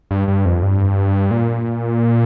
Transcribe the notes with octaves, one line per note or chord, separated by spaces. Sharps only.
G2
G2
F2
G2
A#2